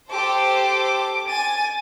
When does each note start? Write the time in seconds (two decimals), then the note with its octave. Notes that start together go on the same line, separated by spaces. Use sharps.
0.11 G4 A4 C5 D6
1.28 G#5 A6 D#7